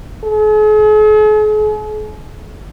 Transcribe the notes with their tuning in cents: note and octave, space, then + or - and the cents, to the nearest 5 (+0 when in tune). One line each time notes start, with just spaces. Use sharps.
G#4 +45